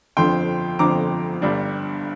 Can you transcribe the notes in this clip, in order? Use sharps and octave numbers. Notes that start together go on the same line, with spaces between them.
G1 F2 D3 F3 G5 C6
G1 F2 D3 F3 A#5 D6
G1 G2 G3 D4